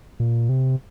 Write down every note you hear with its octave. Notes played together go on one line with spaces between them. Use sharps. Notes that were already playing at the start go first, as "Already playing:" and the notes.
A#2
C3